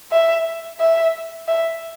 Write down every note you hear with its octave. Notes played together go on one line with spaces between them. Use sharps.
E5
E5
E5